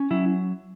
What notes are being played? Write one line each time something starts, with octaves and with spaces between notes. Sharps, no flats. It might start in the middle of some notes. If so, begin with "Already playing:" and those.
Already playing: C#4
F#3 E4